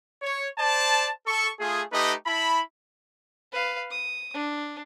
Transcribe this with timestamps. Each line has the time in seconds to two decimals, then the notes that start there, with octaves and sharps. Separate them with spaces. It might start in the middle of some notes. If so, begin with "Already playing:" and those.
0.22 C#5
0.58 C5 D5 A5
1.26 A4 C#6
1.59 A3 F4 G#4
1.92 A3 D#4 G4 B4 D#5
2.25 E4 A5 B5
3.52 B4 F5
3.90 D#6
4.34 D4